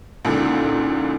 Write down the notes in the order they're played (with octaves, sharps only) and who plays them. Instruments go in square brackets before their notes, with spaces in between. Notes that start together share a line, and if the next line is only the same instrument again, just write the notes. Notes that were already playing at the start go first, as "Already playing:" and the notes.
[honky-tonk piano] C#2 A#2 D3 [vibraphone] C#4 D#4 E4